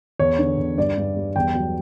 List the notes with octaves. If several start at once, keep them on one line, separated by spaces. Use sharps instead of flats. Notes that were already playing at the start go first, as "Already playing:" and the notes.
E2 C#5
D3
E2
G2 D5
G2
G3
E2 G5
F#3